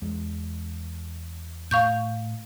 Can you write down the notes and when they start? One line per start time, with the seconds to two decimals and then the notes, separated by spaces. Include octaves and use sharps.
0.02 E2 G#3
1.71 A2 F5 C#6 G6